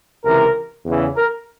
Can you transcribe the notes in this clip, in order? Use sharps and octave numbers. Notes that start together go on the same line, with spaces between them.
C#2 C3 E3 A#4
E2 C#3 E3
A#4